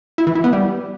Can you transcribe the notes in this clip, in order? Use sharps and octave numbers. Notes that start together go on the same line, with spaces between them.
E4
E3
E4
B3
G3